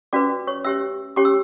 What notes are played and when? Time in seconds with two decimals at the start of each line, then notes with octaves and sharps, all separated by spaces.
0.13 C#4 F#4 B4 D5 D6
0.47 C#5 C#6
0.64 C#4 G4 C#5 E5 E6
1.16 C#4 G4 C#5 D6
1.25 E6